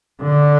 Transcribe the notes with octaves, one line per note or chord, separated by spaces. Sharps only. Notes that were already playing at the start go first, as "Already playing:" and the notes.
D3